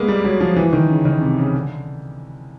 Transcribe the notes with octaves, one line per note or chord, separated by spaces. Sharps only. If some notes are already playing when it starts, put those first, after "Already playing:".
Already playing: G#3 A#3 B3
G3
F#3
F3
E3
D#3
C#3
D#3
C3
C#3
D3